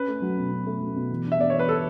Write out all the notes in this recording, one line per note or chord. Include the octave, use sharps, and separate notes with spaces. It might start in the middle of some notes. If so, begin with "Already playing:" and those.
Already playing: C#4 B4
A3
F#3
B2
C#4
A3
F#3
B2
E3
D4
E5
B3 D5
E3 C#5
B4
E3 A4